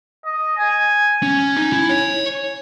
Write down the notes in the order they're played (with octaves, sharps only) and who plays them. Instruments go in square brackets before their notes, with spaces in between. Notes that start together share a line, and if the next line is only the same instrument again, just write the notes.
[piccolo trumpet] D#5
G#5
[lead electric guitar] C#4 [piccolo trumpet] G#5
[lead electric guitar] D#4
E4
C#5